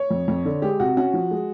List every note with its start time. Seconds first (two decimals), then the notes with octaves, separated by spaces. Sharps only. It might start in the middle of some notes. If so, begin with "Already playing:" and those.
Already playing: C#5
0.11 F2
0.28 F2
0.45 D3
0.62 G#3 G4
0.80 C3 F#4
0.97 C#4 F#4
1.14 F3
1.31 G#3